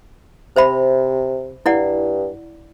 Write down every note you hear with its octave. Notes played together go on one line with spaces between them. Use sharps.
C3 C5 E5 B5
G2 E4 D5 F#5